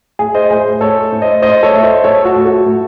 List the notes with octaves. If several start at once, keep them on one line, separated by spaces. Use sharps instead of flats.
A2 G#4
C5 D#5
A2 G#4 C5
A2 A4 C#5
A2
C5 D#5
A2 C5 D#5
A4 C#5
A3 E5
C5 D#5
A2 A4 C#5
F#4 A4
A2
F#4 A4
A2